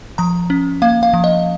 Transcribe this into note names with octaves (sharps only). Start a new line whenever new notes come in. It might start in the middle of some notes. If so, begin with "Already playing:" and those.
F3 A#5
C#4
A#3 F5
F5
F3
D#5